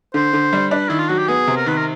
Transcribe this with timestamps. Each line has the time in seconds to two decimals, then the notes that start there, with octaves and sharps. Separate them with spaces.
0.14 D3 C5
0.33 D3
0.53 G3
0.71 D4 B4
0.89 D#3 E4
0.99 F4
1.08 F#3 F#4
1.19 G4
1.28 B3 G#4
1.47 C3
1.57 A#4
1.66 D#3 B4
1.77 A#4